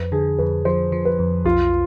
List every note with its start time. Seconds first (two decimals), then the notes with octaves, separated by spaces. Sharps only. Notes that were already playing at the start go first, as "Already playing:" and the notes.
Already playing: F2 B4
0.12 D3 G#4
0.38 F2 B4
0.65 F3 C5
0.92 F3
1.05 B4
1.19 F2
1.45 B1 F4